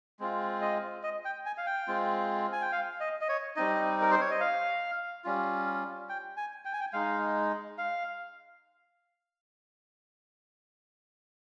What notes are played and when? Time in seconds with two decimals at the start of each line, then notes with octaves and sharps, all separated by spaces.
0.20 G#3 C4 F4
0.62 D#5
1.03 D#5
1.25 G5
1.46 G#5
1.58 F5
1.66 G5
1.88 G#3 C4 F4
2.52 G#5
2.62 G5
2.72 F5
3.00 D#5
3.21 D#5
3.29 C#5
3.56 G3 C4 D#4 D#5
4.01 A#4
4.11 C5
4.21 C#5
4.31 D#5
4.40 F5
5.24 G3 C#4 F4
6.09 G5
6.37 G#5
6.65 G5
6.73 G#5
6.80 G5
6.93 G#3 D#4 F5
7.78 F5